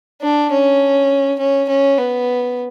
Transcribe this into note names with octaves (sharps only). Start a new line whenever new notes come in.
D4
C#4
C#4
C#4
B3